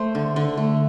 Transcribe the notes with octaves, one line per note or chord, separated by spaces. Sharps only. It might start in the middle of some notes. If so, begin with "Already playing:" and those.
Already playing: A3 C5
D3
D3
A3